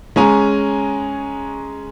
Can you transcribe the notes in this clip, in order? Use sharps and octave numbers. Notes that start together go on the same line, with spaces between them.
G#3 C#4 G#5 A#5